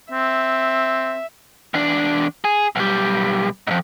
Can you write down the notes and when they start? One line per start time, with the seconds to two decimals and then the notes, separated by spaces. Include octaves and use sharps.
0.12 C4 E5
1.74 E2 D4
2.45 G#4
2.76 B1 G3
3.67 F2 G#2